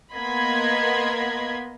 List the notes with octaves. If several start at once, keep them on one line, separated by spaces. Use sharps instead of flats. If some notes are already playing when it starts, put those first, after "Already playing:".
A#3 B3 D#5 B5 C6 G#6